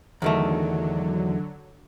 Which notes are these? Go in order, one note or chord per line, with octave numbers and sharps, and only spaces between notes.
E2 D3 D#3 F#3 A3